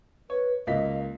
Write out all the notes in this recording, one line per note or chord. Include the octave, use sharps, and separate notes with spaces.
B4 C#5
C#2 A#3 D#5 B6